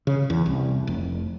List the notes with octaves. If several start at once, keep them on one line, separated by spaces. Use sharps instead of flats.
C#3
E2
C2
F1